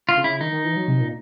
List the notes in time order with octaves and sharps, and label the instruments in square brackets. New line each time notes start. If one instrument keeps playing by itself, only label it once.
[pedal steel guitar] F4
[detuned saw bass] C#3
[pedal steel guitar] E4
[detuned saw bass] D#3 [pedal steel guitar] D#4
[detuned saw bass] D#3
E3
F#3
C3
A#2